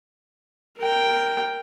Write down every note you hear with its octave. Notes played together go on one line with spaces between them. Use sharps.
A#4 G5